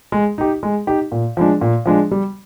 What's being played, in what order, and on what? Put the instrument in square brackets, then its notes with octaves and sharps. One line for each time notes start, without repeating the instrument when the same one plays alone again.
[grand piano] G#3
D#4 G4
G#3
D#4 G4
A#2
F3 G#3 D4
A#2
F3 G#3 D4
G3